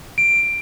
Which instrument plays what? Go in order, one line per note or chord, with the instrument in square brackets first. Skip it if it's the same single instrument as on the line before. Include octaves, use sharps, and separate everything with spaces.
[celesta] D7